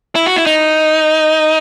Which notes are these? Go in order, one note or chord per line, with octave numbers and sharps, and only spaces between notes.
E4
F#4
E4
D#4